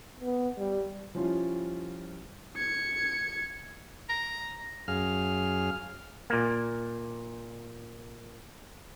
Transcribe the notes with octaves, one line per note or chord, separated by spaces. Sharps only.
B3
G3
F3 G3 C#4 E4 F4
G#6 C#7
A#5
F#2 G#4 F5 F6
A#2 A#3